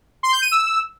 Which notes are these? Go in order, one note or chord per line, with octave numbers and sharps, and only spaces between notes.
C6
G6
D#7
E6